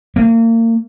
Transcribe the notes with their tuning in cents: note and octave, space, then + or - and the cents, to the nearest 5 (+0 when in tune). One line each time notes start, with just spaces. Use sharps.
A#3 -35